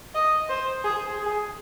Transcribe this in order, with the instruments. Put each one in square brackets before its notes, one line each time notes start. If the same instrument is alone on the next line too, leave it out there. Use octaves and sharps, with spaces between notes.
[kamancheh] D#5
C5
G#4
G#4